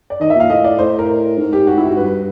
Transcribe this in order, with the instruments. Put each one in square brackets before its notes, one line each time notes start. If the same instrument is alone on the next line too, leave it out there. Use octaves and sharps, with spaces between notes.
[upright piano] D5
[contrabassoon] D#3 [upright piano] D#5
[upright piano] E5
[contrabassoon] A#2 [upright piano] F5
[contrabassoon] A2 [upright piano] D#5
[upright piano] D5
[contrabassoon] A2 [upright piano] C5
[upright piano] A#4
[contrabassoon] G#2
[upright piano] G4
F#4
E4
F#4
[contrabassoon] G2 [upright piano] B4
[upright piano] B4